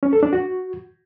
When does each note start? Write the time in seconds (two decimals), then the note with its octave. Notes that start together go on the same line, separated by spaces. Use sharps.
0.03 C#4
0.13 A4
0.23 D4
0.33 F#4